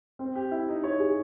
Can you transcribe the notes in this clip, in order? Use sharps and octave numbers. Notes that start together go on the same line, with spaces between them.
C4
G4
E4
D#4
C#5
G#4